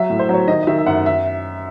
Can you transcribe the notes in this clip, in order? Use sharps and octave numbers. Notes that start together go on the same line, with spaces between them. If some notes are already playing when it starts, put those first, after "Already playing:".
Already playing: F#3 E5
A2
C5
F#3 C#5
D#3 D#5
D#5
D#3 E5
E5
F#2 F#5
E5